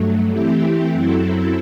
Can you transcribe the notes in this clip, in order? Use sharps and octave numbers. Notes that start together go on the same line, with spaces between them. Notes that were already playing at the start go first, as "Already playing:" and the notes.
Already playing: G2 F#3 A3
E3 A3 C4 E4 G4
F#2 F#3 C4 E4 A4